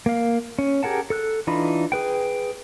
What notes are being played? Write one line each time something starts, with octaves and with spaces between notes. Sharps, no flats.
A#3 F5
C#4
G4 G#4 A#4 F#5 A5
A4 E6 F#6
E3 D4 D#4 F4 B5
G#4 B4 G5